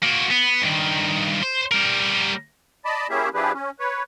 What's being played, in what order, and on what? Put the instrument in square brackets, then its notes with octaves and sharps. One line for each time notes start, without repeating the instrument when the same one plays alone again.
[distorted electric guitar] A#3 F#4
B3
G2 D#3
C5
G3 A#4
[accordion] D5 D#5 A5 B5
A#3 C#4 E4 G4 G#4 E5
F3 D4 E4 G4 G#4 B4
C#4
B4 C#5